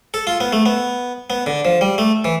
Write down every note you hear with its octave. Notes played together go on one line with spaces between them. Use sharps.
A4
F4
B3
A3
B3
B3
D3
F3
G3
A3
E3